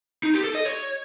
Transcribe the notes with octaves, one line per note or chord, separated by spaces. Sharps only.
D#4
G4
A4
D#5
C#5